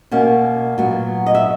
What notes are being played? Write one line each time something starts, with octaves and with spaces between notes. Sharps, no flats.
B2 A#3 C#4
A#2 F#3 B3
D#5
E5